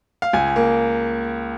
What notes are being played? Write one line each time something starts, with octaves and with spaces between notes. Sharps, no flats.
F5
C#2 G#5
A#3